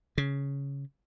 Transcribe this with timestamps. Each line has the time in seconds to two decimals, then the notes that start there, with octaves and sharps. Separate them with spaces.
0.18 C#3